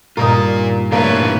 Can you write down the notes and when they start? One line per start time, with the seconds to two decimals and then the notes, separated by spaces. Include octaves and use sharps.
0.17 G2 A#2 A#3 D#4 F4 A#4
0.92 A2 C3 E3 A#3 D4 B4 C#5